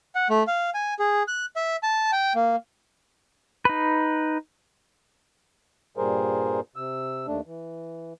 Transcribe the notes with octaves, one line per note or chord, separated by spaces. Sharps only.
F#5
A3
F5
G#5
G#4
F#6
E5
A5
G5
A#3
D#4 B4
G2 A#2 G3 G#4 A#4 C5
C3 E6
D#2 A3 D4
E3